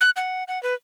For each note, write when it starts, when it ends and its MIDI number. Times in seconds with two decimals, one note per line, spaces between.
0.01 0.10 90
0.16 0.44 78
0.48 0.61 78
0.63 0.74 71